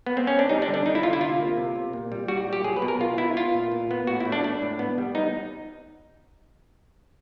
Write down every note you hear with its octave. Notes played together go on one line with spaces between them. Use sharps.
B3
C4
C#4
D4
G3 D#4
D4
D3
D4
D3 D#4
E4
D3 F4
E4
C3 F4
A#3
C3
C3
A#2
G3
G3 F#4
A#2
G4
F#3 G#4
B4
B2
A#4
B3 F4
B3 E4
B3 F4
A#2
A#2
B3
A2 F#4
E4
A3
D4
A3 D4
A2
B3
G3
B3 D#4